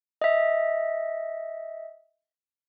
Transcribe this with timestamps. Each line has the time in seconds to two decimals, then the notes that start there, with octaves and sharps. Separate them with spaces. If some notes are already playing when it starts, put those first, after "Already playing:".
0.22 D#5 E5